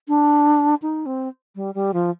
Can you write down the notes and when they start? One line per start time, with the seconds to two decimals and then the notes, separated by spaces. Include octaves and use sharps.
0.08 D4
0.82 D#4
1.06 C4
1.56 G3
1.75 G3
1.94 F3